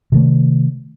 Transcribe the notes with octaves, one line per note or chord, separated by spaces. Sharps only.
C3 D#3 A3